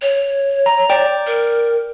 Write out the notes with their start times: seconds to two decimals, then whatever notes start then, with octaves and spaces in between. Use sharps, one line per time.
0.02 C#5
0.66 A#5
0.90 D5 G5
1.27 A#4